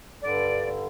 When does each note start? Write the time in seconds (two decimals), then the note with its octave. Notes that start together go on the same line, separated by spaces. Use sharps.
0.21 G2 D3 D5